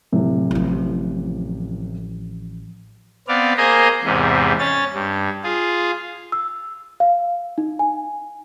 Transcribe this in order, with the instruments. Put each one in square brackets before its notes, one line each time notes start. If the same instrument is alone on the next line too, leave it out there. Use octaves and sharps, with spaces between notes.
[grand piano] D1 C3
[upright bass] A1 F3
[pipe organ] B3 C4 D5 F5
A#3 G#4 C5 D#5 G#5 A#5
E2 G#2 C3
C#4 C#5 A6
G2
F4 G#4
[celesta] E6
F5
D#4
G#5